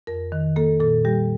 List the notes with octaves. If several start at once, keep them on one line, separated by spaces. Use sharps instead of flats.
F2 A#4
D#3
A#3 A4
A#2 A4
G3 G4